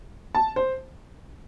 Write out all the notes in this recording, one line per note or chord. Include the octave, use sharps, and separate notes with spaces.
A5
C5